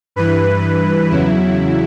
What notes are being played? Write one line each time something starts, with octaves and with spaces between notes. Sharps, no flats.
G2 E3 B4
E2 C#3 F#3 E4